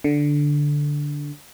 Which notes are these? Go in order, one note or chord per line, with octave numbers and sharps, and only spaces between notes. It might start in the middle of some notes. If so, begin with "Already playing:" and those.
D3